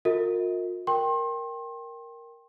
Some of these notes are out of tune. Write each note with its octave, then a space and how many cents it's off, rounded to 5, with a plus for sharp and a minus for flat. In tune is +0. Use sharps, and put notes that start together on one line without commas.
F4 +45 A#4 -25 D#5 +45
A#4 +0 G5 +0 C6 +35